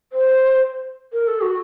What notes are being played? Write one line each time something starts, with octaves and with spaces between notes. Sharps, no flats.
C5
A#4
A4
F#4